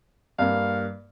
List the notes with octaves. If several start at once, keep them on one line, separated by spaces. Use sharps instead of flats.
G2 A#3 F5